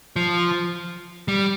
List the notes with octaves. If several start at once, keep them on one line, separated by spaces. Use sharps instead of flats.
F3
G3